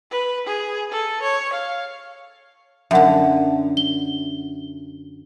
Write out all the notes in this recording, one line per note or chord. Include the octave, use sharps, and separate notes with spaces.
B4
G#4
A4
C#5
F5
F#2 D3 E5 F#5
G7